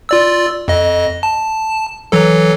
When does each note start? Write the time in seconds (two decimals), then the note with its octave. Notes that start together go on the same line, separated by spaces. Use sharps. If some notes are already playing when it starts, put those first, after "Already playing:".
0.09 F4 D5 E6
0.68 F2 D#5
1.23 A5
2.12 E3 F#3 A4